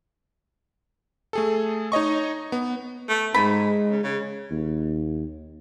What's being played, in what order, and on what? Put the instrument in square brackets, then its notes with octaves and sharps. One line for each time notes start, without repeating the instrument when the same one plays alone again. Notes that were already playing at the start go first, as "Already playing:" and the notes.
[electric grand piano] A3 G#4 A4
D#4 C#5 D#5 C#6
B3
[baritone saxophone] A3
[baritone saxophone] G#2 [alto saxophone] G#3 [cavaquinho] B5
[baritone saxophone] C#3
C#3
[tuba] D#2